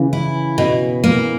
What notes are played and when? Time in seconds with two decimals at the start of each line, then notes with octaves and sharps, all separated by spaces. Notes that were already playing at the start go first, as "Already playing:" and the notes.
Already playing: C#3 E3
0.13 E4
0.58 B2
1.04 A#3